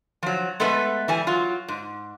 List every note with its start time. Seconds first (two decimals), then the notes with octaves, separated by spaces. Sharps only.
0.23 F3 F#3
0.60 G#3 A3 B3 A4 B4
1.08 E3 G3 G#5
1.27 F#3 F4
1.68 G#2